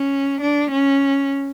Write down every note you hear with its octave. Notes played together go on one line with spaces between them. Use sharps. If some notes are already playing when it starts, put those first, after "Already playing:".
Already playing: C#4
D4
C#4